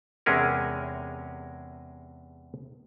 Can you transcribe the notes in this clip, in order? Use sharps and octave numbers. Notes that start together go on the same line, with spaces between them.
E2 C3 G#3 C#4 G#4 A#4